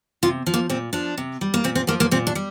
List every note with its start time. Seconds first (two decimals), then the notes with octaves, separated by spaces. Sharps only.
0.23 C3 F4
0.47 F3
0.54 A#3
0.70 A#2 C4
0.93 F3 D4
1.18 C3
1.41 G3
1.54 A#3
1.64 A#2 C4
1.75 C4
1.87 F3 A#3
2.00 A#3
2.11 A#2 C4
2.27 D4
2.35 G3